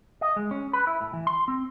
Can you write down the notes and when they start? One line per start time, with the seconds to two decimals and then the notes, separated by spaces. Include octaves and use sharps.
0.21 D#5
0.36 G#3
0.51 C#4
0.73 B4
0.87 E4
1.01 A2
1.13 E3
1.27 C6
1.48 C4